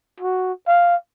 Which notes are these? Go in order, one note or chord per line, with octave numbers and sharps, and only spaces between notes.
F#4
F5